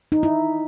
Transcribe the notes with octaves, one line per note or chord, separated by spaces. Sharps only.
D#4
E4